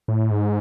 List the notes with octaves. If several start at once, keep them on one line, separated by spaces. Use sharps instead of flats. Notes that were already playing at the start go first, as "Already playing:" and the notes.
A2
G#2